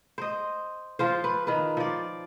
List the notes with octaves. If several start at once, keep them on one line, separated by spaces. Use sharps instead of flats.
C5 D#5
F3 F4 C5
B4
D#3 B4
F3 D5